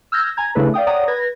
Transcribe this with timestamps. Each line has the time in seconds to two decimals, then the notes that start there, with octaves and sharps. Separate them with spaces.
0.12 E6 F6 G6 G#6 A#6
0.37 G#5 A#5 G#6
0.55 C#3 A3 D4 E4 A4 B4
0.74 D5 F5 G5 D#6
0.86 C#5 D5 F#5 G5 A#5 D#6
1.08 B4 G#6 A#6